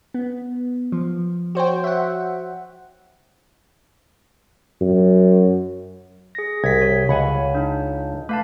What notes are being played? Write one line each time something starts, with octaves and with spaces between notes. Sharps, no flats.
B3
F3
F#4 C5 C#5 G5
E5 F#5
F#2
G#4 A#6
C2 G#6 B6
C#5
C#2 F#5 G#5 B5
D4 D#4
A3 B4 F5 A5